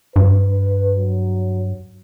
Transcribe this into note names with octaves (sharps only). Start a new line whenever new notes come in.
G2 B4
F#3